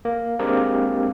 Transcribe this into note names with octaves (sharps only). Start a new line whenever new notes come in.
A#3
G#3 A#3 C4 D4 G4 A#4